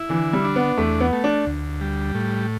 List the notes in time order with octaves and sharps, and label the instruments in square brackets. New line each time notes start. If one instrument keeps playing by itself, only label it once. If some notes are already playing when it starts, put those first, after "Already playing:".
Already playing: [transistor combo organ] E4
[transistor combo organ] D3 [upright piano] E3
[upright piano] G3
[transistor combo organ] D4
[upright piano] B3
[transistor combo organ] E2 [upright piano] A3
[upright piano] B3
[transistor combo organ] A3
[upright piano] D4
[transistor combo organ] D2
G3
A2